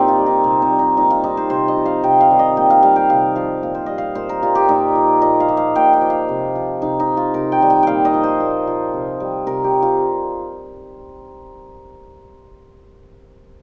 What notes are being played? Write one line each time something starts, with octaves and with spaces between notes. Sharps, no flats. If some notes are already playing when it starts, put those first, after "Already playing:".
Already playing: A#2 C4 D#4 G4 C5
F4
G3
D#4
C3 C4
C4
G3
D#4
A#2 D#4
F4
G3 D#4
C5
C3 C5
D#5
F3
F5
C3 G5
F5
D#3 G3
D#5
A#2 G5
F5
G3 F5
G5
C3 F5
F3 F5
A#2 F5
C5
G3 D#5
F5
A#2 C5
A#4
G3 F4
G4
A#2 D#4
F3
A#2 D#5
F5
F3
F5
A#2 G5
G5
F3
F5
C3
F3
C3 D#4
D#4
F3
F4
C3 A#4
G5
D#3 G3
G5
A#2 F5 G5
D#5
F3
C5
A#2
F3
C3
G3
C3 A#4
G4
G3
F4